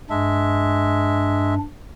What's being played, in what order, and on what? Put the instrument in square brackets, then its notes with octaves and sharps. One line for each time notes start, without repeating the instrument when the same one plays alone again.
[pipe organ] G2 D4 [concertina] G#3 E5